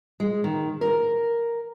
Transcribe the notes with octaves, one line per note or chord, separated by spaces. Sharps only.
G#3
D#3
A#4